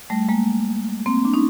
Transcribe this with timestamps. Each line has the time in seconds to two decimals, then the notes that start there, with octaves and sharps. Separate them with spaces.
0.10 G3 A3
0.29 G#3 A#3
1.06 A#3 C4
1.25 D4
1.34 C#4 D#4